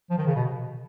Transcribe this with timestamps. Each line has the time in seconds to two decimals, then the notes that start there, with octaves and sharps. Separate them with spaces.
0.10 F3
0.18 D#3
0.27 C#3
0.36 B2